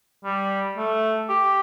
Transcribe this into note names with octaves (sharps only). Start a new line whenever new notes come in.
G3
A3
G4